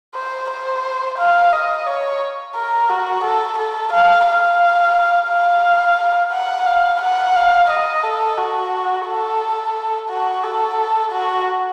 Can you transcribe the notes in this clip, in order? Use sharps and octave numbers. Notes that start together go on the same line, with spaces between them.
C5
C5
F5
D#5
C#5
A#4
F#4
A4
A4
F5
F5
F5
F#5
F5
F#5
F5
D#5
A4
F#4
A4
F#4
A4
F#4